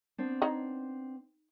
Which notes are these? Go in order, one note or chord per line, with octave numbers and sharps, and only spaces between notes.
B3 C4 D4
D#4 C#5 D#5